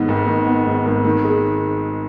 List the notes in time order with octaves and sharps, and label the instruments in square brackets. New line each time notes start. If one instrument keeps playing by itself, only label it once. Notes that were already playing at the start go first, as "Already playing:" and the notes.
Already playing: [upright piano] G#2 D#3 B3
G#1
D#3
B3
G#2
G#1
D#3
G#3